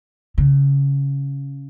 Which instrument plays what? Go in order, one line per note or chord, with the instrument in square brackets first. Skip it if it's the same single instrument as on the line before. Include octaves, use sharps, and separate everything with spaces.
[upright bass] C#3